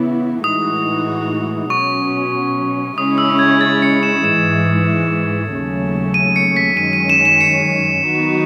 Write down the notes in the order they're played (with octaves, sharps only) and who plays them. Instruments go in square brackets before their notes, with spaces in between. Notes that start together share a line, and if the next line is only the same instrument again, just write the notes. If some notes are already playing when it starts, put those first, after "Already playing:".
Already playing: [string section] C#3 E3 B3 E4
[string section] A2 E3 G#3 D#4 F#4 [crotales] D#6
[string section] B2 F#3 C#4 [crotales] C#6
[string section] C#3 G#3 C#4 E4 [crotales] D#6
[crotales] E6
G#6
A6
C#7
E7
[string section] G#2 E3 G#3 [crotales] E7
[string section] D#2 C#3 F#3 A3 C#4
[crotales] D#7
C#7
B6
[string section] F#2 D#3 G#3 C#4 [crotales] D#7
[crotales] D#7
E7
E7
C#7
[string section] D#3 F#3 B3 D#4 F#4